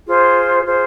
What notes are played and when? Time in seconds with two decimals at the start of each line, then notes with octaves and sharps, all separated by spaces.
0.05 F4 G#4 C5
0.63 F4 G#4 C5